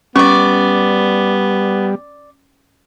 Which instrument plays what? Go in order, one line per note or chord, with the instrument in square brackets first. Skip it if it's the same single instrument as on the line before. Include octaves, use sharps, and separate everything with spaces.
[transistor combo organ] G3 [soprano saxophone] B3 [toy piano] C#4 [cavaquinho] D5 C#6